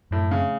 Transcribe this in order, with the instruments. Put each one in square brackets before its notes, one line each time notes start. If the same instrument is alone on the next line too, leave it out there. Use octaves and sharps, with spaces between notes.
[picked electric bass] F#2 [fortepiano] A2
[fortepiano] C#3 [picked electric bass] A3